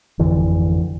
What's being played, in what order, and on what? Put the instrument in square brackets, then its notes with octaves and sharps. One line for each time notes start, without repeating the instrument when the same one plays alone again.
[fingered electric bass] G#1 F2 D3 E3